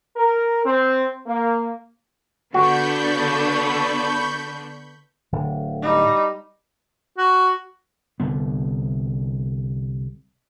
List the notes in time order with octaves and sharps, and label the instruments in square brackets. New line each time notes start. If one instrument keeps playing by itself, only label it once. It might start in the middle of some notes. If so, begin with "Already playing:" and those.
[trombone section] A#4
C4
A#3
[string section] D3 B3 D4 [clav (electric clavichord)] F#4 [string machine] B5 C#6 G6
[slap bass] D1 D3
[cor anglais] G3 [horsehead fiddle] D#4
[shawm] F#4
[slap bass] C2 D3 B3